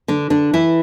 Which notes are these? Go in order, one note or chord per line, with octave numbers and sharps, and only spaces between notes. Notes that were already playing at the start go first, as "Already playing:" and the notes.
D3 D4
D3 D4
E3 E4